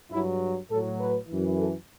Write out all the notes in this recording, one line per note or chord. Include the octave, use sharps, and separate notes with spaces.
G2 F#3 E4
A2 F#3 A4
B4
F#2 E3
A4